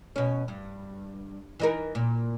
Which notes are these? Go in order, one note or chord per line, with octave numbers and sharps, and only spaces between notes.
B2 C#4
G2
E3 D#4 A#4
A#2